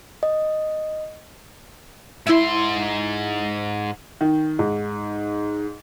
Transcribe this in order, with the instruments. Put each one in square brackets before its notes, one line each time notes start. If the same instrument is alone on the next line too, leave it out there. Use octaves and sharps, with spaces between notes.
[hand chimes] D#5
[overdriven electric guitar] G#2 C6 [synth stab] E4 E5
[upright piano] D#3
G#2